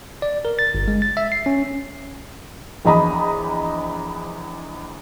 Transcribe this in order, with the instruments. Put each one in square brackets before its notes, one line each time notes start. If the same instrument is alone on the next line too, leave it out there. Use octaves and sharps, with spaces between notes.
[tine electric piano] D5
A#4
A6
G1
G#3
A6
E5
C7
C#4
[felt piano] A#1 E2 D#5 A#5 B5 D#6